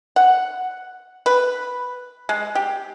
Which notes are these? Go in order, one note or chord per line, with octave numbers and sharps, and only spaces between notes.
F#5
B4
G#3
G4